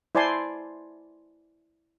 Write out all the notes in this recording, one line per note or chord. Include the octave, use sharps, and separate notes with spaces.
E4 C5 D5 G#5 A5 C6